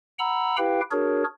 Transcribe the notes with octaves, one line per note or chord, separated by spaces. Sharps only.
F#5 A#5 B5 E6
E4 G4 B4 F5 G5
D4 F#4 G#4 A#4 C#5